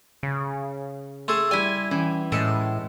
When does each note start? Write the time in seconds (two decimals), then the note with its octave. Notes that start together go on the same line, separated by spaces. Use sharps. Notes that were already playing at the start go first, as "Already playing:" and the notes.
0.23 C#3
1.28 A3 G#4 A4 C6
1.51 G3 E4 G#5
1.91 E3 C#4
2.32 A2 G#3 A4